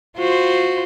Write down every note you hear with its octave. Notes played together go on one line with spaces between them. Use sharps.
F4 F#4 C5